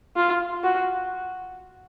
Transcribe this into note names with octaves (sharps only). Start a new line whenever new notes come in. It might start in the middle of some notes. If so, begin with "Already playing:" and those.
F4
F#4